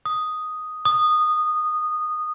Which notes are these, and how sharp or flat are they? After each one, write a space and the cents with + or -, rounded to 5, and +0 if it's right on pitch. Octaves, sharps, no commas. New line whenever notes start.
D#6 +0
D#6 -15